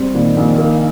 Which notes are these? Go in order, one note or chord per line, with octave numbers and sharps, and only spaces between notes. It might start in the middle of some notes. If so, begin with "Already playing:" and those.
Already playing: G3 C4
A#2 D#3
A#1
A#3